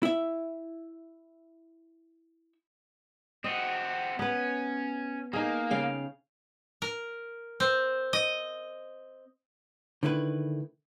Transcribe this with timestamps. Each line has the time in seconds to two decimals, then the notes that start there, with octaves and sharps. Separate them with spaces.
0.03 E4 E5
3.44 C4 F#4 D#5
4.19 B3 C#4 B4
5.33 A#3 D#4 G#4
5.70 C#3 F5 G5
6.82 A#4
7.60 C4
8.13 D#5
10.03 D3 D#3 A3 E4 B4